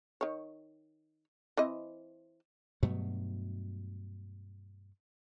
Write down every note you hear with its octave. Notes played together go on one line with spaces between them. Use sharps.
D#3 C#5
E3 C4 D#5
G2 B2 F#3 A3